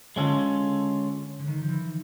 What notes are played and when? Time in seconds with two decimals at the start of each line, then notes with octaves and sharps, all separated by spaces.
0.16 D3 G#3 C#4 F4 A4
1.39 D3
1.47 D#3
1.61 F3
1.68 E3